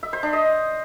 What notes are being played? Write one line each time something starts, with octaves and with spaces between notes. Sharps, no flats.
E5
C5
D4
D#5